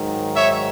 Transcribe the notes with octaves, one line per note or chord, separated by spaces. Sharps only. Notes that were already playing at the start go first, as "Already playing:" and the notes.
Already playing: G#2 D#3 F#3
C#5 E5